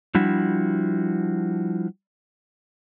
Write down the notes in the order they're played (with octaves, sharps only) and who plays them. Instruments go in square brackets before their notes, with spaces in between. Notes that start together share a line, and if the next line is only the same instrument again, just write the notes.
[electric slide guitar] F3 G3 D4 E4 F#4